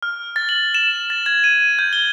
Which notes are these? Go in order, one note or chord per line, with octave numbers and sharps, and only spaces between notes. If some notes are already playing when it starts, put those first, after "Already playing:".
F6
A6
F#7
E7
A6
G#6
D#7
G6
G7